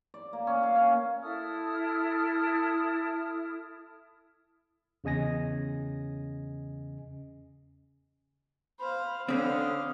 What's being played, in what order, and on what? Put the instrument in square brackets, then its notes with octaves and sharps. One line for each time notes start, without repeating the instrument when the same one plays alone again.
[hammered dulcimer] D5
A#3
C#4
F5
C#4
[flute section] E4 A4 D#6 F6
[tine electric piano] E2 C#3 D#5 G#5 A#6
[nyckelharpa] C5 F5 [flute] B5
[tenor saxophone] D3 [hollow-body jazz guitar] C4 C#4 [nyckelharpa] F5 [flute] D#6